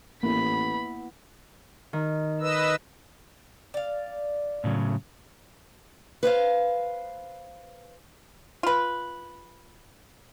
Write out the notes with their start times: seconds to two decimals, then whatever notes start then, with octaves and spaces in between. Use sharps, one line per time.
0.23 A1 A#3 B3 E4 B5
1.93 D#3
2.41 B4 D#5 E6
3.74 D5 F5
4.64 A2 C#3 F#3
6.23 B4 C5 E5 F5
8.63 F4 B4